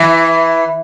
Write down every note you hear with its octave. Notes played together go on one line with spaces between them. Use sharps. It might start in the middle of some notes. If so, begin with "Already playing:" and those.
Already playing: E3